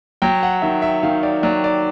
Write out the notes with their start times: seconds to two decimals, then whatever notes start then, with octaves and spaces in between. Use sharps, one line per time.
0.22 F#3 G5
0.43 F#5
0.62 D#3 E5
0.82 E5
1.03 D#3 F5
1.23 D5
1.43 F#3 D5
1.64 D5